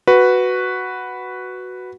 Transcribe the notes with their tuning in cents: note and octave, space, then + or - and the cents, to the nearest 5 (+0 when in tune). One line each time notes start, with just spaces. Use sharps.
F#4 +0 B4 +0